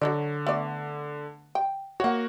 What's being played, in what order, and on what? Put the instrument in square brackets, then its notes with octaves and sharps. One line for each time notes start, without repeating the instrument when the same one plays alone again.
[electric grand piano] D3 [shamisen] F#3 G#3 D5
[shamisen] A3 B3 D5
G5
[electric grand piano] A#3 F#4 [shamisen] C#5 F#5